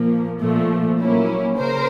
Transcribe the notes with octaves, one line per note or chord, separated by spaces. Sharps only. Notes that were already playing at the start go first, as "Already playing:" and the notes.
Already playing: A#2 F3 A#3
A#2 F3 A3
F#3 A#3 C#4 E4
C#3 A#4 C5